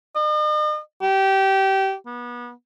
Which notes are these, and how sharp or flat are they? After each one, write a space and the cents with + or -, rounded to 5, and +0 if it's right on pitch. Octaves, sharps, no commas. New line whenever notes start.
D#5 -45
G4 -20
B3 -30